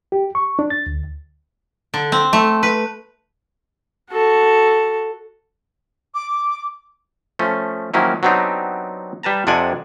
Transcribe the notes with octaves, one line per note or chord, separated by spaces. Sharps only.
G4
C#6
D4
A6
D2
D3
C4
A3
B4
F#4 A4
D6
F3 A3 C#4
D#3 F3 F#3 A#3 C#4 E4
F#3 B3 C4 D4 D#4 G4
G3 B4 A5 A#5
F2 C3 D4 D5 F#5 G#5